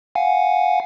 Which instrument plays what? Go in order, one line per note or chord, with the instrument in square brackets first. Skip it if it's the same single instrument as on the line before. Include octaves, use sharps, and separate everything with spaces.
[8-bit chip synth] F5 F#5 G#5